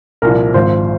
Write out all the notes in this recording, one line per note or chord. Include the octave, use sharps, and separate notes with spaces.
C2 A#2 F3 A#4
G#1 G#2 F3 C5